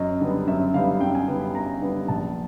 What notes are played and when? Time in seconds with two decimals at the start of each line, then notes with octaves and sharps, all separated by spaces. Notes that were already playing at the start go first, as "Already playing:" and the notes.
Already playing: F#2 D#5
0.20 D3 G3 B3
0.47 F#2 E5
0.74 D3 G3 B3 F5
1.01 F#2 G5
1.15 G#5
1.28 D3 G3 B3
1.41 B5
1.55 F#2 A#5
1.81 D3 G3 B3
2.08 A#1 A5